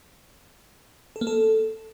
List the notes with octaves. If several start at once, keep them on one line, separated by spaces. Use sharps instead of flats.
A4
A#3
A4